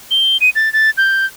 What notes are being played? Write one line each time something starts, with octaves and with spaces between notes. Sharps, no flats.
G7
D#7
A6
A6
G6